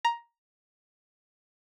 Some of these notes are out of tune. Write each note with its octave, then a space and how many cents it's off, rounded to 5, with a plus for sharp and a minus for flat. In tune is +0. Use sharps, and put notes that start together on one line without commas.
A#5 +10